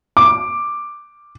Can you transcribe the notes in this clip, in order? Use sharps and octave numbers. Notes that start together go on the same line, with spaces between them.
D6